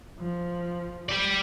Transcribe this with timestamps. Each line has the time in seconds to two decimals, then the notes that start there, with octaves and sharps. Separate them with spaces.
0.19 F3
1.09 G4 D5